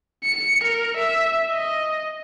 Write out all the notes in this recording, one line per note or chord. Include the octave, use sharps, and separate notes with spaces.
C#7
A#4
E5
D#5